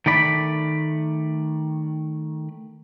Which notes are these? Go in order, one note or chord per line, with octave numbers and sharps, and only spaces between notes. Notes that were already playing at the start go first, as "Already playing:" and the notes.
D#3 A3 D5 B5